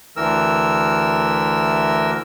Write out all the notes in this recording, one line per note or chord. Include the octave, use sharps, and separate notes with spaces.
D2 E3 A#4 E6